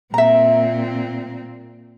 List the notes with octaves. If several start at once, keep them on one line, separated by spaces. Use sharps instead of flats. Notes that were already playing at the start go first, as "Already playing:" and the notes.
A#2 C4 E5 A#5